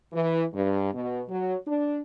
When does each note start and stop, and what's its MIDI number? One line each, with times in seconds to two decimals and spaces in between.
0.13 0.43 52
0.53 0.88 43
0.93 1.21 47
1.29 1.55 54
1.66 1.98 62